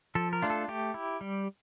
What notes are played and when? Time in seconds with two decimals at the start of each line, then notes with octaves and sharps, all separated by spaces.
0.15 F3 A4
0.33 A#4
0.42 A3 D4 F4
0.50 A4
0.68 A3 G4
0.94 E4
1.21 G3